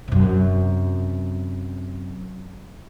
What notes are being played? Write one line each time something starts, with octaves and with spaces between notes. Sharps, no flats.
F#2 C3